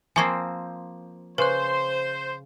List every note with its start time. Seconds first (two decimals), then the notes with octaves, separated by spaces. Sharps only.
0.16 F3 A#3 C4 G#5 C#6 G#6
1.38 C#3 B4 C5 F#6